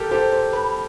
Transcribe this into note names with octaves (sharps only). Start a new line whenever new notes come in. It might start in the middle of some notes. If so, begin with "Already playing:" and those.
Already playing: G4 A4 A#4
G4 A4 C5
C5
B4